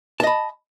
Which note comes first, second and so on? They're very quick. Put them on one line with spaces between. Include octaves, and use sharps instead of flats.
A5 D#5 B5